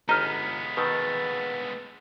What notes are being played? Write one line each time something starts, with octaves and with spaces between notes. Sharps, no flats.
G1 G#3 B3 D#4 D#5 A#5 F6
B2 D#3 B4 E6 A6